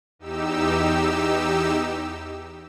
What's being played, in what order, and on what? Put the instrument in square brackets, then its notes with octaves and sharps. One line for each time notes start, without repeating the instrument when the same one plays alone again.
[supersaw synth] E2 D#4 G4 E6